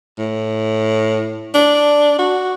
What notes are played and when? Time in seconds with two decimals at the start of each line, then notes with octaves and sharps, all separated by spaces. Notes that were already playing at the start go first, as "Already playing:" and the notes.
0.18 A2
1.54 D4
2.18 F#4